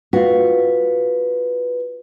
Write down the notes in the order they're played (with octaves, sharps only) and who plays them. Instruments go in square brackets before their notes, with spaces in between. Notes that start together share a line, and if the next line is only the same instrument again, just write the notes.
[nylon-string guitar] F4 F#4 [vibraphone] B4